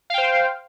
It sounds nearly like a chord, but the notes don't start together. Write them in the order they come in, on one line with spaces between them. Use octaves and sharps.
F5 G5 C5